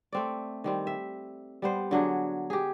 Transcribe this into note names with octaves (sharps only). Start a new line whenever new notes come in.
A3 C4 D5
D#3 G3 C4
E5
G3 B3 C5
D3 F#3 D4 G#4
G4 G#4